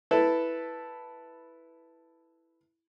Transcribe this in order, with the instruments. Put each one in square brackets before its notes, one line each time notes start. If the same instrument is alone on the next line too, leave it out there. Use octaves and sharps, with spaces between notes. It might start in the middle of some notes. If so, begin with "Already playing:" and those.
[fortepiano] E4 A4 B4